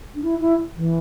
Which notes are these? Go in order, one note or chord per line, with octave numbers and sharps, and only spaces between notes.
D4
E4
E4
E3